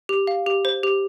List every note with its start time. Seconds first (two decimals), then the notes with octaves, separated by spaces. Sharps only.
0.09 G4
0.27 F5
0.47 G4
0.65 C5
0.83 G4